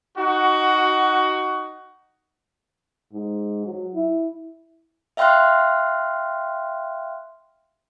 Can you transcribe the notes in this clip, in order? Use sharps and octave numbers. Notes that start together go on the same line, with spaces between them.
D#4 F#4
G#2
F#3
E4
E5 F5 G5 C6 F6 F#6